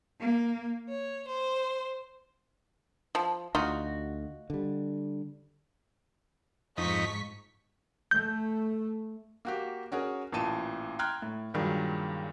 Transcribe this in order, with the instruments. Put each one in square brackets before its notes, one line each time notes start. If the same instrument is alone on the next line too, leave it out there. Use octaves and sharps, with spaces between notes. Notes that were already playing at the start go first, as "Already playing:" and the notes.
[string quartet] A#3
C#5
C5
[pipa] F3
[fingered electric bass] D2 [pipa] D#4 F4 F#4
[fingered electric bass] D3 G3
[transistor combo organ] F2 D#4 [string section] G#2 C#6 B6
[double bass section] A3 [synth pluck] G6
[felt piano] A#3 F#4 G4
C#4 F#4 G#4 A#4
A1 A#2 A5 D#7 E7
G5 A#5 C6 F6 F#6 G#6
A2
G2 A#2 D#3 F#3 G#3